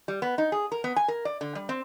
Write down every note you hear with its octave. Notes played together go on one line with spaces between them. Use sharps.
G3
B3
D#4
G#4
A#4
B3
G#5
A#4
D5
D3
G3
C4